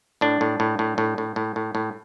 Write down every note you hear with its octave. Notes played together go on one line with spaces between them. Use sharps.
A2 D4
A2
A2
A2
A2
A2
A2
A2
A2